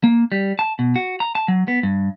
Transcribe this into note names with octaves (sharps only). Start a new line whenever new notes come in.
A#3
G3
A5
B2
F#4
A#5
A5
F#3
B3
G2